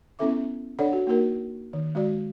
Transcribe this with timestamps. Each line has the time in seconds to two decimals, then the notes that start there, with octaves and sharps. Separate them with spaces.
0.19 B3 C#4 E4 A4 E5 D6
0.79 D4 A4 C#5 D5 F#5
0.93 F#4
1.07 A#3 D#4 F#4 A#4
1.73 D#3
1.95 G#3 F#4 D5